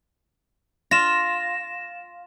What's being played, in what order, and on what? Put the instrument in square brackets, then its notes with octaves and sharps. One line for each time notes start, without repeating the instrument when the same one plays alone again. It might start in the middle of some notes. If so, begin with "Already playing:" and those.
[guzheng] F4 [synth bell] A#6 E7